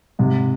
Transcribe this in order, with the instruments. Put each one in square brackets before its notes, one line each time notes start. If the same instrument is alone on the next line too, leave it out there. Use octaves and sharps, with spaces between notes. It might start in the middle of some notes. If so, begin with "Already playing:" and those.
[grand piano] G#2 C3